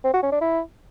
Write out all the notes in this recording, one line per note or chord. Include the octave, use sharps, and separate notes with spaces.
C4
F#4
C#4
D4
E4